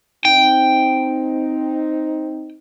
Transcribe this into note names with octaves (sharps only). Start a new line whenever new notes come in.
C4 D#4 G5